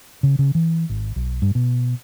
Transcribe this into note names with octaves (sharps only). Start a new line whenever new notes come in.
C#3
C#3
E3
G#1
B1
G2
B2